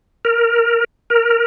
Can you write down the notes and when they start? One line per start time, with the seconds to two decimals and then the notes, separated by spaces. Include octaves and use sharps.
0.25 A#4
1.10 A#4